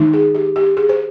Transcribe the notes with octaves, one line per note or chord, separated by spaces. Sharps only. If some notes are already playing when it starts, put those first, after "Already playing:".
Already playing: D#3 G#3 D#4
G#4
G4
G4
G#4
C5